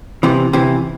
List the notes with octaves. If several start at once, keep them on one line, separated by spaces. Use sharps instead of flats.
C3 E3
C3 E3